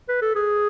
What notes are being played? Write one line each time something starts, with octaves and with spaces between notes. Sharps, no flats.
B4
A4
G#4